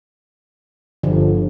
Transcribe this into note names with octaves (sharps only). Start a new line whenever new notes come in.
G1 D3 F3